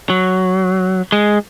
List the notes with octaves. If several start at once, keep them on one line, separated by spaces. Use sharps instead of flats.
F#3
G#3